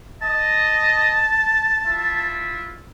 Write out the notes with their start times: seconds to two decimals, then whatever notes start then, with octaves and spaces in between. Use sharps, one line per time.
0.22 D#5 A5
1.85 E4 F4 E5